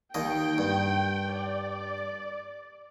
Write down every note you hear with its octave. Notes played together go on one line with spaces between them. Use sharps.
D#2 D#5 G5
G2
D5